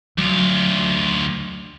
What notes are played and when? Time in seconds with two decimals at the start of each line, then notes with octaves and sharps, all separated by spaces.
0.18 D2 F#3 F4